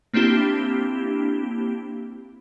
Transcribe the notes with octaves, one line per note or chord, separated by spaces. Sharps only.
A#3 C4 D4 E4 G4